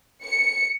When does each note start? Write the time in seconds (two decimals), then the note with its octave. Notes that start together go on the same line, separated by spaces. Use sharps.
0.24 C#7